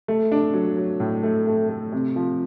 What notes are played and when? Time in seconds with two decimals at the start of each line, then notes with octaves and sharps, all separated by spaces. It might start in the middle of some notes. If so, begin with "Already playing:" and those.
0.08 A3
0.32 D4
0.54 F#3
0.77 F#3
1.00 A2
1.23 A3
1.47 A3
1.69 A3
1.92 C3
2.16 F3